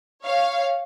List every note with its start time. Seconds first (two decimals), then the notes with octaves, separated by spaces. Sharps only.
0.24 C#5 F5